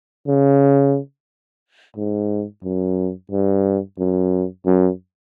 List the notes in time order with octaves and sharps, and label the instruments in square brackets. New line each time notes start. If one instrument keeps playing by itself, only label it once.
[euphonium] C#3
G#2
F#2
G2
F#2
F#2